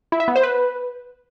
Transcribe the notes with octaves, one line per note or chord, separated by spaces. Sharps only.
E4
E5
B3
C5
B4